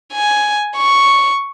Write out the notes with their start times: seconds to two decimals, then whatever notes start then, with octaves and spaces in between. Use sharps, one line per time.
0.13 G#5
0.76 C#6